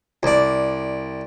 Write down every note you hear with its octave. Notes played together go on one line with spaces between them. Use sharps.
C2 D5